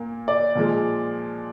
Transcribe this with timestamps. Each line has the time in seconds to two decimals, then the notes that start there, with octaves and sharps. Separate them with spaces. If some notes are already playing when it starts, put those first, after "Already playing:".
Already playing: A#2 A#3
0.28 D5
0.55 A#2 F3 G#3